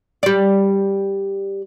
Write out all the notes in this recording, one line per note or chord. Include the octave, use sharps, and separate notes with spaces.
G3 D5